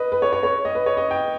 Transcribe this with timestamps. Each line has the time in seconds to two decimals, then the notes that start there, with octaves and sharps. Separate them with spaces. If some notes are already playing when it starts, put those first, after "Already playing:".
Already playing: B4 D#5
0.12 B4
0.22 C#5
0.33 C#5
0.43 C#5
0.65 D#5
0.75 B4
0.86 C#5
0.97 D#5
1.11 G5